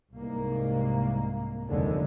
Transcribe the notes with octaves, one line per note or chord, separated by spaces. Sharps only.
C2 G#2 A#3
F1 D#2 D3 G#3